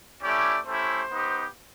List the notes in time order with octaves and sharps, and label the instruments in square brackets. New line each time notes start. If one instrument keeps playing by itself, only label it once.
[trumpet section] A3 C#4 E4 G4 D5
A3 C#4 E4 G4 C5
B3 D#4 G4